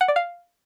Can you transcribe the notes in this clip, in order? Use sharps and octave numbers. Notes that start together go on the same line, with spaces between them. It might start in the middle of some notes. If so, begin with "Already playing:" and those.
F#5
D5
F5